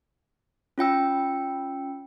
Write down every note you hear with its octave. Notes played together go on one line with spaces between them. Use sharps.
C#4 F4 G5 E6